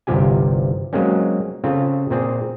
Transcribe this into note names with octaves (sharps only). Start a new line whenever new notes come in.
G1 C2 C3 F3 G4 G#5
F#3 G#3 A#3 C4 C#4
C#3 C4 F4 A4
A#2 C4 G#4